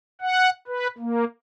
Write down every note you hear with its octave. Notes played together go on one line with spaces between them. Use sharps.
F#5
B4
A#3